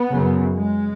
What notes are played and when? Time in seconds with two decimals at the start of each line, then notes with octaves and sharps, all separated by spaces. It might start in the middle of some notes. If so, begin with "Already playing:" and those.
Already playing: B3
0.09 F#2 C#3
0.57 G#3